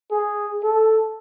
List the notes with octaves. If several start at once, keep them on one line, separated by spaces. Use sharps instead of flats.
G#4
A4